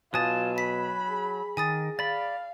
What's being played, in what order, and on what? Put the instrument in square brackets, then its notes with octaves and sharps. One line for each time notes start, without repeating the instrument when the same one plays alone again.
[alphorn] B2 [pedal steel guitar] F#3 G#5 A5 [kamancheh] F4 [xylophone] D#6 A6
[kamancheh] B5 [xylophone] B6
[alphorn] G#4
[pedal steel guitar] D#3 [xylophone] G#5 D#6 A6
[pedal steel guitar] D5 B5 [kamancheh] F5 [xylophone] A6